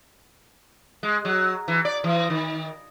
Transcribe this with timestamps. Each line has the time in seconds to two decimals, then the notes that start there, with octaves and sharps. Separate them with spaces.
1.03 G#3
1.25 F#3
1.68 E3
1.85 D5
2.04 E3
2.30 D#3